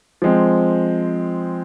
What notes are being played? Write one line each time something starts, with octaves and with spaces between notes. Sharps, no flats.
F3 G#3 C4